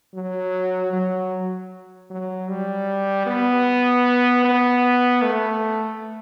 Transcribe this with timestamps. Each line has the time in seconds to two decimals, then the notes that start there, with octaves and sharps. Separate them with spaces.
0.14 F#3
0.93 F#3
2.10 F#3
2.49 G3
3.26 B3
4.45 B3
5.22 A3